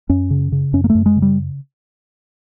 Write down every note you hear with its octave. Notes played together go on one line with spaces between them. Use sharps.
F#2 C#4
C#3
C#3
F#2 C#4
A#3
A3
F#2
G#3
C#3
G3